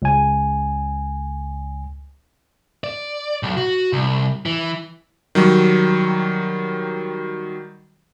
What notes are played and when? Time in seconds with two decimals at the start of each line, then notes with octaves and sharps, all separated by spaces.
0.02 C#2 G#5
2.84 D5
3.43 B1
3.57 F#4
3.93 C2
4.46 E3
5.35 D#3 F#3 G3